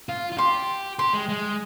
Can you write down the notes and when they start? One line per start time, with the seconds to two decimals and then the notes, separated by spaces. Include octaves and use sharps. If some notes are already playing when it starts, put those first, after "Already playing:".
0.09 F4
0.32 F4
0.38 G4 C6
0.99 G4 C6
1.13 G#3
1.29 G#3